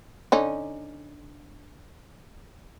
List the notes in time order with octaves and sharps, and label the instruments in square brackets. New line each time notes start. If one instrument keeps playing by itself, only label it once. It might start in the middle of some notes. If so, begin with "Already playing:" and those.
[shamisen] D3 C#4 D#4